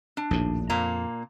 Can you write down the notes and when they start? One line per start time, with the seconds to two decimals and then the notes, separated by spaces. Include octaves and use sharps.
0.17 D4
0.31 A#1 D#2 A2
0.70 F2 A#2 A#3 A#5